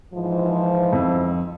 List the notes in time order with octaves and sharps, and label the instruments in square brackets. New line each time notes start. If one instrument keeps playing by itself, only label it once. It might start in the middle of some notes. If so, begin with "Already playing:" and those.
[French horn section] G#2 E3 F3
[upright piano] F2